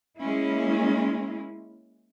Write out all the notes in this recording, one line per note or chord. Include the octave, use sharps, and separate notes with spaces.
G#3 A#3 C#4 E4